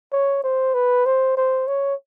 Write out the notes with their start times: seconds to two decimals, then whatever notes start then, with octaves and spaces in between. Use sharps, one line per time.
0.12 C#5
0.44 C5
0.74 B4
1.06 C5
1.37 C5
1.67 C#5